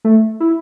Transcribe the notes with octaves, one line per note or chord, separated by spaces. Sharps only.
A3
E4